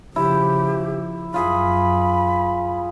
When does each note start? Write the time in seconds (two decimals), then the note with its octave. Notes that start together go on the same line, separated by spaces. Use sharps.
0.16 C#3 F3 E4 G4
1.34 F#2 F4 G#4 B5